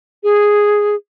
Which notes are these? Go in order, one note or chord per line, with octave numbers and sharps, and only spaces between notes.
G#4